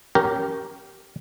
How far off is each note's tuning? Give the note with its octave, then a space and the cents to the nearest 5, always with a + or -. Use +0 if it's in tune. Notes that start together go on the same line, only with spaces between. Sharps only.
C#4 +0 G4 -15 A#4 +0